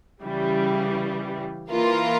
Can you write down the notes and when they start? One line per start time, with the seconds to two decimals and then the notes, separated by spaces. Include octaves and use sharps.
0.22 C#3 E3 G3
1.70 E3 A#3 F4 A#4